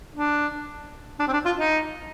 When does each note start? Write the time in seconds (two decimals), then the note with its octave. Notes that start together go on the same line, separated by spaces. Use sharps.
0.15 D4
1.20 D4
1.28 C4
1.33 D4
1.46 F4
1.59 D#4